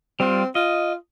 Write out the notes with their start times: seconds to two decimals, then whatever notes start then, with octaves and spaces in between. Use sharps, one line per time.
0.20 G3 C4 F4
0.55 F4 D#5